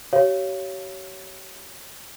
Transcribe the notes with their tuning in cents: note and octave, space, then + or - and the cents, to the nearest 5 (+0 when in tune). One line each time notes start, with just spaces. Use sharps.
G4 -45 C#5 +5 F5 -25